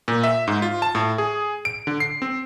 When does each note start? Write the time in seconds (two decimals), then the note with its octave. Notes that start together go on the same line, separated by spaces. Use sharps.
0.08 A#2
0.23 E5
0.48 G#2
0.62 F4
0.82 A5
0.95 A2
1.18 G#4
1.65 D7
1.87 D3
2.00 C7
2.22 C4